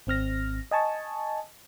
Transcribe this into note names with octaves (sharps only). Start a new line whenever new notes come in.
G#1 C4 F6 A#6
D#5 G#5 A5 C#6